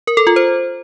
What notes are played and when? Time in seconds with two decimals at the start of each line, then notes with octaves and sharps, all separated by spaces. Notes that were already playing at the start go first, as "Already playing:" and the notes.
0.07 A#4
0.17 A4
0.27 F4
0.36 C5